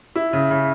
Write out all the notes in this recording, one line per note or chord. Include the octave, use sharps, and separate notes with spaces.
E4
C#3
C#3